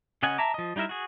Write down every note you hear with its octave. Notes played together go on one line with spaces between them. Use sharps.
C#3 C#4 D#5 F#5 G#5
E5 A5 A#5 D6
F3 D#5
G3 D#4 E4 A#4 E5
F#4 G#4